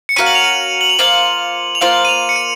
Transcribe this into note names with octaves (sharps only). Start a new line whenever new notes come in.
C#7
C#4 F#4 A#4 F5 D#7
F#7
F7
D#7
F#7
F7
A#3 F4 C5 F5 F#7
F7
A#3 F4 C5 F5 F#7
D#7
F7
C#7
D#7